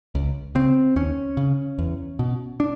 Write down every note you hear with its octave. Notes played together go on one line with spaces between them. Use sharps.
C#2
C#3 C4
D#2 C#4
C#3
E2
B2
D4